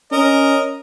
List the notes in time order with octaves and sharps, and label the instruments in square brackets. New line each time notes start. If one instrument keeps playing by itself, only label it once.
[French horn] C#4 [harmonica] A#4 D#5